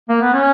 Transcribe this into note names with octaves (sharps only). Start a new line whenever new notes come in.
A#3
B3
C#4